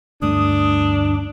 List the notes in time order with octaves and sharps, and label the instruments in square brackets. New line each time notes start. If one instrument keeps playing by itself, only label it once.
[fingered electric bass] D2 G2 A3 [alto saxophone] D4 [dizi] D#6